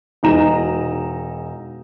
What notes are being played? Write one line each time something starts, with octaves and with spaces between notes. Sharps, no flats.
E1 D#4 A#5 E7